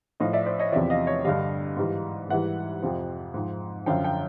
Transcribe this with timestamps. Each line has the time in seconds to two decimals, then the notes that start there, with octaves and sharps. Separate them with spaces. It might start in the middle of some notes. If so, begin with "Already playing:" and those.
0.20 A2 F3 D#5 F5
0.33 D5 E5
0.46 C5 D5
0.59 C#5 D#5
0.72 E2 C3 F3 D5 E5
0.90 D#5 F5
1.07 C#5 D#5
1.25 G2 D3 G3 D#5 F5
1.77 G#2 E3 G3
2.29 G#2 E3 G3 E5 F#5
2.82 F2 C3 F3
3.34 G#2 F3
3.86 F#2 D3 F3 F5 G5
4.04 F5 G5